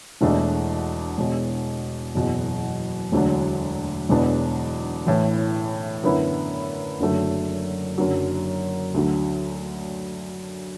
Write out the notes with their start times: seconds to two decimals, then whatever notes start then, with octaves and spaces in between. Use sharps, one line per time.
0.21 E1 E2 B2 A3 D4
1.18 E1 E2 B2
2.14 F#1 E2 B2
3.12 E1 D2 D3 F#3 D4
4.09 E1 E2 B2 B3 D4
5.06 A1 A2 E3
6.03 F#2 D3 B3 E4
7.00 F#1 F#2 D3 F#3 A3
7.98 F#1 F#2 D3 F#3
8.94 D2 D3 F#3